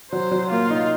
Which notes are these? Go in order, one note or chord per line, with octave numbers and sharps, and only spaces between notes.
F#3 C5
F#3
A#3 F4
D#4